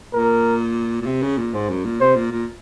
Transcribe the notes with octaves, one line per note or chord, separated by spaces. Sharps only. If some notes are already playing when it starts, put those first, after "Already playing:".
A#2 A#4
A#2
C3
C#3
A#2
G#2 C5
F#2
A#2
C3 C5
A#2
A#2